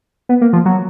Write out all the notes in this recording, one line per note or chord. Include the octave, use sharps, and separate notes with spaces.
B3
A#3
F3
F#3